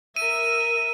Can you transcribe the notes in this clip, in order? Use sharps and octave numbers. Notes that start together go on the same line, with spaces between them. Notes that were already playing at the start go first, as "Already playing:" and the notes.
A#4 E5 D#7